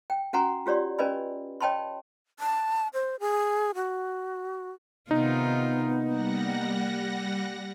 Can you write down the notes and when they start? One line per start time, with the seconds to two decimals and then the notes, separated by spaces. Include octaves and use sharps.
0.10 G5
0.33 C#4 F#4 F#5 G#5 A#5 C6
0.66 F4 G4 C#5 D5 C6
0.99 C#4 B4 D5 D#5 G#5 B5
1.61 C#5 D#5 G5 A5 B5 C6
2.40 A5
2.94 C5
3.20 G#4
3.75 F#4
5.11 C3 D#3 B3 D#4 F4
6.05 G3 A#3 F#5 A#6